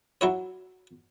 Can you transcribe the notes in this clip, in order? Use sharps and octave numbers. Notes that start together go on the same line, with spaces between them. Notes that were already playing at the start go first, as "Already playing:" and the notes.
F#3 E4 C#5